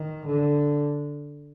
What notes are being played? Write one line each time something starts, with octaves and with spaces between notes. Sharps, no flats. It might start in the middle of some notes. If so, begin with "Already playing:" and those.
Already playing: D#3
D3